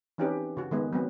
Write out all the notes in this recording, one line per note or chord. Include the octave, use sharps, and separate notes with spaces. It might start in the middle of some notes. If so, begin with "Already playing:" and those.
E3 C4 C#4 D#4 G4 B4
C#3 F#4
D#3 G#3 B3
F#3 B3 C4